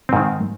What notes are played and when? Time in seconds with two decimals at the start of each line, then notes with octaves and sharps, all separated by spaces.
0.09 C4
0.13 G#2
0.16 D#3